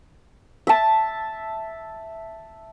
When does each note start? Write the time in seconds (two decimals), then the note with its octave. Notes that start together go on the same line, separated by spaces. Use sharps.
0.67 E5 A5